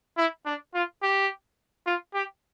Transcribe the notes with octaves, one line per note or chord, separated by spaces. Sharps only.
E4
D4
F4
G4
F4
G4